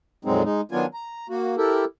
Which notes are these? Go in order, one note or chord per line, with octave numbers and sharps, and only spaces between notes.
F2 A#2 F#3 G#3 C4 D#4
G#3 D#4
D#3 F#3 B3 D4 F4 G#5
A#5
A#3 F#4
E4 G4 A4 A#4